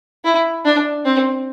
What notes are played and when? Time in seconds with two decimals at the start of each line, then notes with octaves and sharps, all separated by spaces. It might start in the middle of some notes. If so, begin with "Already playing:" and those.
0.24 E4
0.65 D4
1.05 C4